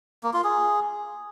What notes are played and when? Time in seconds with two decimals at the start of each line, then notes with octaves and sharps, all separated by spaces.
0.23 A#3
0.34 F4
0.44 G#4